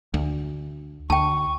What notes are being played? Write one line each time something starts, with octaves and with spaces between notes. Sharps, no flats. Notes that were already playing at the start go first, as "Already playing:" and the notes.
D2
D2 G5 A5 C#6